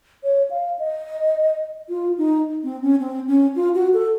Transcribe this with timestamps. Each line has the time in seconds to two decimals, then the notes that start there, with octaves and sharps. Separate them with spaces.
0.23 C#5
0.50 F5
0.79 D#5
1.89 F4
2.18 D#4
2.64 C4
2.83 C#4
3.00 C4
3.28 C#4
3.56 F4
3.75 F#4
3.94 A4